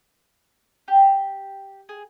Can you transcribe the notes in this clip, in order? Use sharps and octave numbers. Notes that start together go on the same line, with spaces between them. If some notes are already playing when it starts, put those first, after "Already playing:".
G4
G#4